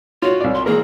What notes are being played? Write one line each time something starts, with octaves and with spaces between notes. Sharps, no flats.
F4 F#4 C#5
C2 D5
C6
E3 A#3 G#4 A#4